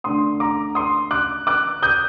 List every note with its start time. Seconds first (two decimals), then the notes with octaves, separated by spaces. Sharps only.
0.04 D3 A3 D4 C6 D#6
0.40 A#5 D6
0.75 C6 D#6
1.11 D6 F#6
1.47 D6 F#6
1.82 D#6 G6